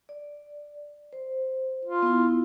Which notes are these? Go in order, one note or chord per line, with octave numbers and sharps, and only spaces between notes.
D5
C5
F4
B3 E4